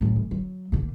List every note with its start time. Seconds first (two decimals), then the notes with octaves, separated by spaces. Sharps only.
0.01 F#2 A2
0.16 E3
0.31 F#3
0.72 A#2 D3